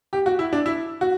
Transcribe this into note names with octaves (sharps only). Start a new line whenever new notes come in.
G4
F#4
E4
D4
E4
F#4